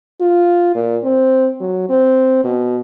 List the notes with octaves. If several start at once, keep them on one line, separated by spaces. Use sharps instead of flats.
F4
A#2
C4
F#3
C4
B2